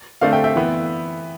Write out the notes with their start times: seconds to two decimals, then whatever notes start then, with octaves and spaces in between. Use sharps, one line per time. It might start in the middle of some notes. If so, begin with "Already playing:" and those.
0.21 D3 A3 C4 D5 F5
0.32 E5 G5
0.44 E5 G5
0.56 E3 B3